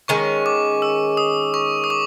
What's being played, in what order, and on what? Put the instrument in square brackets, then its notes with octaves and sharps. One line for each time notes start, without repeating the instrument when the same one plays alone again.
[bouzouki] D#3 G#3 C#4 [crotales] C#6
[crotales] D6
E6
D#6
C#6
D#6
D6